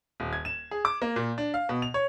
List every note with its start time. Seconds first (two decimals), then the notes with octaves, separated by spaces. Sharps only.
0.20 D#1
0.33 G#6
0.45 E7
0.71 G#4
0.85 D6
1.02 A#3
1.16 A#2
1.38 D4
1.54 F5
1.69 B2
1.82 F7
1.94 C#5